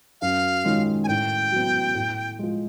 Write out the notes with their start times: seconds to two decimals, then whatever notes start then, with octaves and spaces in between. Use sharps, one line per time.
0.21 F#2 F5
0.65 D#3 G#3 C#4 F4
1.04 G#5
1.08 A2 G5
1.51 F#3 B3
1.95 A2
2.39 F3 G#3